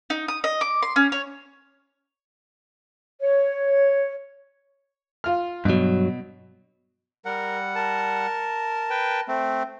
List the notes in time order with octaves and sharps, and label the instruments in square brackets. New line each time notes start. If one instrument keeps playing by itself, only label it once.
[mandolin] D#4
D#6
D#5
D6
C6
C#4
C#5
[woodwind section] C#5
[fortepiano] F4 F6
[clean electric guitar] G2 F#3 [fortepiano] B2
[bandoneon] G3 F#5 [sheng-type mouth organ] A#4
[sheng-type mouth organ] A#4 A5
[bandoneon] B4 G5
A3 C4